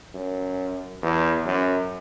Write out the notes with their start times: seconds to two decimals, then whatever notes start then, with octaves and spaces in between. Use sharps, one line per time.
0.15 F#2
1.02 E2
1.46 F#2